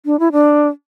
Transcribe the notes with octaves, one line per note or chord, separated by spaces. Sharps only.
D4
E4
D4